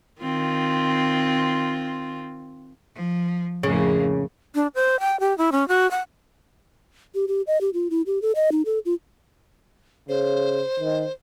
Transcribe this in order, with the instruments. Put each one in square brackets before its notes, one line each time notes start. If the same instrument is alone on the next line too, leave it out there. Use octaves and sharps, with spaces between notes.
[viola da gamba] D#3 C4 F4
[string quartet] F3
[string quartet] F2 A2 A#3 [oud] C#3
[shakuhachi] D4
C5
G5
G4
E4
C#4
F#4
F#5
[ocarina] G4
G4
D#5
G4
F4
E4
G4
A4
D#5
D#4
A4
F4
[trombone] C#3 [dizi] C5
[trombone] D#3